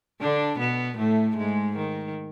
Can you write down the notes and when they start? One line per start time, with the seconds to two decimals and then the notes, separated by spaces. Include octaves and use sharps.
0.21 D3 D4
0.59 B2 B3
0.98 A2 A3
1.37 G#2 G#3
1.76 D#3